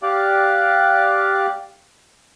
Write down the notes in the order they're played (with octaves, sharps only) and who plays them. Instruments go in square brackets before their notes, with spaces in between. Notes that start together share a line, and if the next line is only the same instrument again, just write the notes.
[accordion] G4 D5 F5 D6 F#6